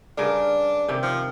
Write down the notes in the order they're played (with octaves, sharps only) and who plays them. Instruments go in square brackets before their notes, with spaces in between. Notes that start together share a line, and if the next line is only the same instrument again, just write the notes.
[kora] G2 C#3 A#4 [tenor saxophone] D4
[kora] C3 D#3 G4
[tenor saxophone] F3